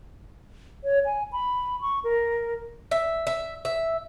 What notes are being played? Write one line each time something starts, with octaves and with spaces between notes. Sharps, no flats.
C#5
G#5
B5
C#6
A#4
E5
E5
E5